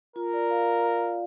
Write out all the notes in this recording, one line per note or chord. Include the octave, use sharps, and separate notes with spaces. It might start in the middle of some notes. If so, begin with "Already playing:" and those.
F4 A#4
D5
F5